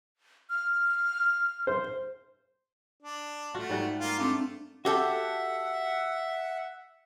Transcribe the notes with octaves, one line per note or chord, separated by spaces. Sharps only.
F6
C5
D4
A3 F4 F#4
G#2 G3 F#5
A#3 F4
A3 C4 D4 A4
F#4 G4 A4 E5 F#5